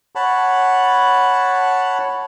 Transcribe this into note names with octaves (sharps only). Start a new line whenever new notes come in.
C#5 F#5 A5 B5